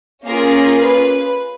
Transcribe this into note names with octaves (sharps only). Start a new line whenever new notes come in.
A#3 C#4 F4 G#4 A#4
B4